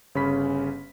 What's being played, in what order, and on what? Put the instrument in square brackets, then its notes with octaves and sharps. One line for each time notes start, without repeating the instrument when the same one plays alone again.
[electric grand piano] G1 C#3 C#4 B5 B6